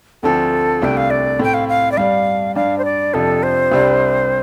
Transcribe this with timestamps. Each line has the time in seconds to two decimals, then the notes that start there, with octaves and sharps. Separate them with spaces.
0.23 D2 D3 F3 C4 A4
0.82 C2 C3 A3 D4 G5
0.97 F5
1.10 D5
1.39 A2 A3 C4 G5
1.54 F5
1.69 F5
1.92 D5
1.97 G2 G3 D4 F5
2.55 G2 G3 D4 F5
2.78 C5
2.85 D5
3.14 F2 C3 F3 D4 A4
3.43 C5
3.72 C2 C3 G3 D4